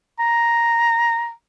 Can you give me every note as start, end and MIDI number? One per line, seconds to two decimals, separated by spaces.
0.19 1.31 82